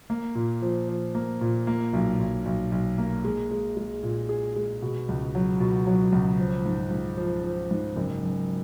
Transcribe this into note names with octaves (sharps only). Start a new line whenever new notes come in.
A#3
A#2
F3
F3
A#3
A#2
A#3
B1
B1
B1
B1
A#3
G#3
G#3
G#3
A#2
G#4
G#3
B2
C#2
F#3
B2
F#3
C#2
F3
G#2
G#2
F3
F3
G#2
F#1
F#2